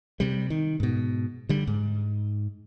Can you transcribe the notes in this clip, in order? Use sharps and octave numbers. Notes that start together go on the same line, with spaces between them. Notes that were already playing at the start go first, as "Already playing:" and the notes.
C3 G3
D#3
G#2 B2
D3 G3
G#2